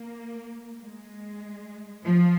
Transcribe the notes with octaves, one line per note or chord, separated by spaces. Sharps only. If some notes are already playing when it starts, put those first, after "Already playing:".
Already playing: A#3
G#3
F3